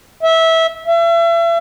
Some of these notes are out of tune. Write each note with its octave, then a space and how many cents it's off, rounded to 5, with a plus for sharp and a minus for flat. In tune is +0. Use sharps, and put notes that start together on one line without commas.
E5 -20
E5 +35